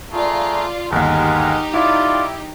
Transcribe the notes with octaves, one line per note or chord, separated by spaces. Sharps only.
A3 F4 G#4 D5 A#5
G1 D#2 G#3 D#4 G4 A#4 F#5
E4 F4 D5